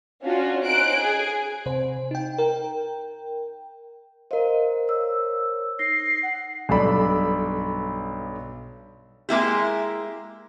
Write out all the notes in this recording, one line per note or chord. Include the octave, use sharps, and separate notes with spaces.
C#4 D4 F4 F#4
C#4 D#4 C5 F#6 D7
G#4 G#5
C3 C5
D#4 G5
A#4 G5
A#4 C5 D#5 F5
C#5 E6
D#4 A#6 C7
F#5
B1 G2 A4 D5 B5
G#3 A#3 E4 G4